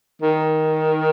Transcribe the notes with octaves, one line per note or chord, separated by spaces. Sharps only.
D#3